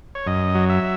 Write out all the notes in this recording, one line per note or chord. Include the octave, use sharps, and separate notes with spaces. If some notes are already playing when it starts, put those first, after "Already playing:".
C#5
F#2 D#5
F#3
E5